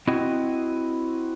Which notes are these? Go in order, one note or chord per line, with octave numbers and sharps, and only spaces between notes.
C4 E4 F#4 D#5